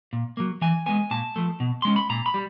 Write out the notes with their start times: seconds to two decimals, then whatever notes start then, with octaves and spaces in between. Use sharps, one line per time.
0.13 A#2
0.37 F#3 A#3
0.62 E3 G#5
0.86 G#3 B3 G#5
1.11 A#2 A5
1.36 F3 A3
1.60 B2
1.82 G#3 C#4 C6
1.96 B5
2.10 A#2 A#5
2.26 B5
2.34 G3